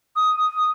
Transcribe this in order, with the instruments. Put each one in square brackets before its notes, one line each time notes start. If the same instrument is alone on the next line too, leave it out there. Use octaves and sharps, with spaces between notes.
[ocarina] D#6